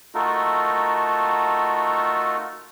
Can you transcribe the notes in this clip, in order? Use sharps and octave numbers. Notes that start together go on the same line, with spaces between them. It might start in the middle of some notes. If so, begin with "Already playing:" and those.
A3 D#4 F4 F#4 A4 A#4